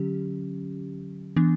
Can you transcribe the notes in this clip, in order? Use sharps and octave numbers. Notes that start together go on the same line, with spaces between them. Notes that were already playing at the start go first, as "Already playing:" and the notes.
Already playing: D3 F#3 C#4 G4
E3 B3 D4